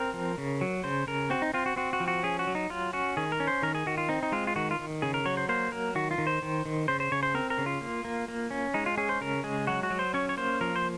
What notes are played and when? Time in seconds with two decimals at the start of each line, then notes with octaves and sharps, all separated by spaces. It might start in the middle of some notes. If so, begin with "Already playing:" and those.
Already playing: C4 A#4
0.14 F3
0.38 C#3
0.61 F#3
0.84 C#3 C5
1.07 C#3 A#4
1.30 C4 F#4
1.42 D#4
1.54 C4 F4
1.66 F#4
1.76 C4 F#4
1.93 F#4
2.00 F3
2.08 F#4
2.23 C#4 G#4
2.39 F#4
2.47 F#3
2.55 D#4
2.70 F#3 F4
2.93 C#4 F#4
3.17 D#3 G#4
3.32 A#4
3.40 C#4
3.47 C5
3.62 D#3 A#4
3.75 G#4
3.86 D#3 F#4
3.97 F4
4.09 C4 D#4
4.23 D#4
4.32 G#3 F4
4.47 F4
4.56 D#3 F#4
4.71 F4
4.79 D#3
5.02 C#3 G#4
5.14 A#4
5.26 F#3 C#5
5.37 C5
5.49 A#3 C5
5.72 F#3 A#4
5.95 D#3 F#4
6.11 F4
6.18 D#3
6.27 C5
6.42 D#3
6.65 D#3
6.88 C#3 C5
7.00 C5
7.12 C#3 C#5
7.23 C5
7.34 C4 A#4
7.50 A#4
7.58 C#3
7.66 F4
7.81 A#3
8.05 A#3
8.28 A#3
8.51 C#4
8.74 G#3 D#4
8.86 F4
8.97 C#4 G#4
9.09 C5
9.21 C#3 A#4
9.44 G#3 G#4
9.67 F#3 F#4
9.83 F#4
9.90 F#3
9.99 C5
10.14 C#4 C#5
10.29 C#5
10.37 A#3 C5
10.61 F3 A#4
10.76 C5